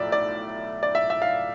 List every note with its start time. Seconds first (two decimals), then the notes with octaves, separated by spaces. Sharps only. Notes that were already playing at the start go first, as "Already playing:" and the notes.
Already playing: B1 A2 F3 A3 D5 E5
0.12 D5
0.83 D5
0.95 E5
1.10 E5
1.22 F5